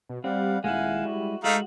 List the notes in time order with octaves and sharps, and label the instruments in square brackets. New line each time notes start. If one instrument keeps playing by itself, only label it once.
[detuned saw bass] B2
[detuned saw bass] G3 [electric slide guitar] C4 [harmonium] F5 F#5
[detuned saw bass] D#1 [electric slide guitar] G#3 E4 [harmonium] F5 F#5 G#5
[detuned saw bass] G3 [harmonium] F#4
[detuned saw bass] G#3 [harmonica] A3 D#4 F5 [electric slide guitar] F#4 [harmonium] D#5